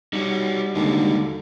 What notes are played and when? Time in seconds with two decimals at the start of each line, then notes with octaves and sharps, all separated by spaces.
0.13 G3 D#4 F#4 C#5
0.75 D#2 D3 G#3 D4 F#4